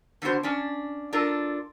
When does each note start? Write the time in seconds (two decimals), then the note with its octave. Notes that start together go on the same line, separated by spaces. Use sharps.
0.22 D3 B3 D4 F#4 C5
0.43 C#4 D4
1.13 D4 F4 A4 A#4